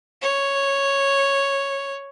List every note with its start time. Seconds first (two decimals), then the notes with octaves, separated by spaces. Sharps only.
0.22 C#5